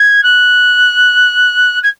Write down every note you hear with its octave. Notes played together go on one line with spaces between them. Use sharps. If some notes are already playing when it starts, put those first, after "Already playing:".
Already playing: G#6
F#6
G#6